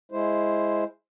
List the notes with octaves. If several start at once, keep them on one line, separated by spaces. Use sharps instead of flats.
G#3 E4 C5